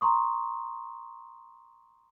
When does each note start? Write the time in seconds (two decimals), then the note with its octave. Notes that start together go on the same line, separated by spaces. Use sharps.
0.01 A#5 C6 C#6 D#6